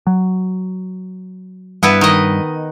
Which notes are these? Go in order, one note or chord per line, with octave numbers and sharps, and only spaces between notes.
F#3
G2 B3 E4 B4
D#3 D#5